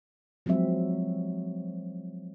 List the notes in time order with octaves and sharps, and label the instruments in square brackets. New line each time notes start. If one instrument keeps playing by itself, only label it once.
[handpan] F3 F#3 G#3 C4 E5